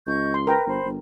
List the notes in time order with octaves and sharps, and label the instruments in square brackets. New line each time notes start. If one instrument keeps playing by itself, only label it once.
[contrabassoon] C#2 [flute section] D#5 C#6 G6
[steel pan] C6
[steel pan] A#4 G5 A#5 [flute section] B4
[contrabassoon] G1 [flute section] C5 B5
[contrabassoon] G1